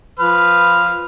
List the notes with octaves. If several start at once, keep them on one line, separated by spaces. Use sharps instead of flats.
F3 B4 F6